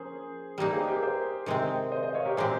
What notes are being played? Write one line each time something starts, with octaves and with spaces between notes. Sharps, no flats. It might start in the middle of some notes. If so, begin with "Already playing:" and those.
Already playing: F3 A#3 C#4 G#4 C5
G3 A#3 D#4 G4 A#4
G#4 C5
G4 A#4
G#4 C5
C3 D#3 G#3 C4
C5 D#5
C5 D#5
C#5 F5
G4 A#4
A#2 G#3 C4 G4 G#4 C5